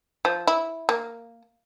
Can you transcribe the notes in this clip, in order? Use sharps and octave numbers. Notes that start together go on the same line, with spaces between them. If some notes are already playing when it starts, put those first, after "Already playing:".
F3
E4
A#3